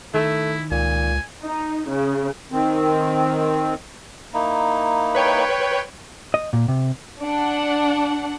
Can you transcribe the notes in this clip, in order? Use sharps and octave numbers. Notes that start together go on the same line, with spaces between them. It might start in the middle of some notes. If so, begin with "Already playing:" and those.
D#3 A3 E4
C#2 A#2 G#5
D#4
C#3
D#3 C4
A#3 D#4 E4
B4 C#5 G5
D#5
A#2
C3
D4 F#5